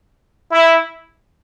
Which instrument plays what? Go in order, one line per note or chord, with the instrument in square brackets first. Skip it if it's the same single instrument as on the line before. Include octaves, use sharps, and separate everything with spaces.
[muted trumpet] E4